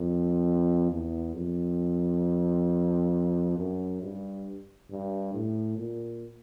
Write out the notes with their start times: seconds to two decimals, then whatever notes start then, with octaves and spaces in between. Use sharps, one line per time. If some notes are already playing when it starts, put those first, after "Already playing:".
Already playing: F2
0.91 E2
1.35 F2
3.57 F#2
4.02 G2
4.90 G2
5.34 A2
5.78 A#2